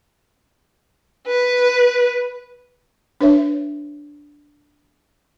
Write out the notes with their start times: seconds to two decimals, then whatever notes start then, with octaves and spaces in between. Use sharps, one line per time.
1.26 B4
3.21 D4 B4 C#5 E5